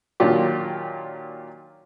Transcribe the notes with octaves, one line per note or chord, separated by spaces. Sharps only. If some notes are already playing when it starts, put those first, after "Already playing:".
A#2 D#3 F#3 D4 F4 G4